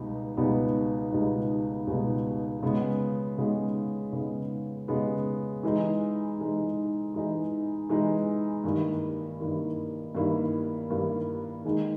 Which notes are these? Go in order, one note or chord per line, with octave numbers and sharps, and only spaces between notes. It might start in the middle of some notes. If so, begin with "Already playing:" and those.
Already playing: C#2 B2 G3 B3 D#4
C#2 B2 G3 B3 D#4
C#2 B2 G3 B3 D#4
C#2 B2 G3 B3 D#4
C#3 G#3 B3
C#3 G#3 B3
C#3 G#3 B3
C#3 G#3 B3
E3 G#3 D#4
E3 G#3 D#4
E3 G#3 D#4
E3 G#3 D#4
G2 D#3 A#3 E4
G2 D#3 A#3 E4
G2 D#3 A#3 E4
G2 D#3 A#3 E4
D#3 G#3 D#4 G#4